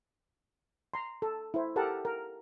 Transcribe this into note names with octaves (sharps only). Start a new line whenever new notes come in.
A#5 C6
A4
E4 C5
G4 A4 A#4 F#5 A5
A#4